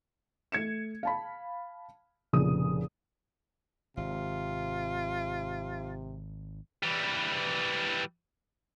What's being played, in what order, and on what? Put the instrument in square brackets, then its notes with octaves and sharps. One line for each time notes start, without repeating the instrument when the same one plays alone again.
[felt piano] A3 G#6 C#7 E7
F5 A5 B5
F1 A#2 C#3 D#6
[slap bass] G#1 [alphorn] C3 [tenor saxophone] F4
[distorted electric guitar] E3 G3